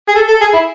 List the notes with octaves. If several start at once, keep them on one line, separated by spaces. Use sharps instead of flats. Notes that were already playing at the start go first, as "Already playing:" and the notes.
G#4
A4
A4
G#4
E4